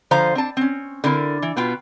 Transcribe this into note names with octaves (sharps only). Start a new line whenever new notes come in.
D3 F3 C5 F5 A#5
C4 D4 A5
C4 C#4
D3 C4 E4 A#4
E3
B2 B3 F4 G5